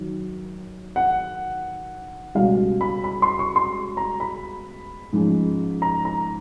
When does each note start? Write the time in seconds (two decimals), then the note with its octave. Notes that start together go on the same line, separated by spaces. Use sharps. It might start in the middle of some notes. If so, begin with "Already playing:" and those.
Already playing: D#3 F#3
0.96 F#5
2.35 C#2 B2 G3 F5
2.81 B5
3.04 B5
3.22 C6
3.39 C#6
3.56 C6
3.97 A#5
4.20 B5
5.13 G#2 F3 G#3 C#4
5.82 A#5
6.05 A#5